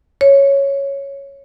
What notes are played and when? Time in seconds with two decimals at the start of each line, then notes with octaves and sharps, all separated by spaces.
0.21 C#5